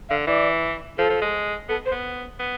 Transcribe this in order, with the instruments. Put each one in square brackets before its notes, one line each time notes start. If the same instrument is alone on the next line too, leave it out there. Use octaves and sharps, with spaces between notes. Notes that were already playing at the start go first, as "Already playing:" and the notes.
[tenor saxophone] D3 [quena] F5
[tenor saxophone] E3 [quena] D5
[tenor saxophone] F3 [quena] A4
[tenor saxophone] F3
G#3
[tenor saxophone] B3 [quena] A4
[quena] C5
[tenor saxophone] B3
B3